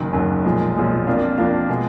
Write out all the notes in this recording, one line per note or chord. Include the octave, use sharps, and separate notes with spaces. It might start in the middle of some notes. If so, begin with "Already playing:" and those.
Already playing: F#1 F#2 D#3
F#1 F#2 D#3
B1 A#2 F3 G#3
B1 A#2 F3 G#3
F2 F3 A#3 D4 F4
F2 F3 A#3 D4 F4
B2 G#3